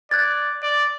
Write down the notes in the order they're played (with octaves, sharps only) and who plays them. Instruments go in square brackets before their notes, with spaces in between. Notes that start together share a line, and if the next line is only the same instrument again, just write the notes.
[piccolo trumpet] D5 [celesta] F#6 G#6 A6
[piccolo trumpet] D5